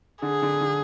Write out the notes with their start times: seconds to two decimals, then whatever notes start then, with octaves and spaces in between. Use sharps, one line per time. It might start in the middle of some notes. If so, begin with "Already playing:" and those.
0.22 D3 G#4
0.42 D3
0.61 D3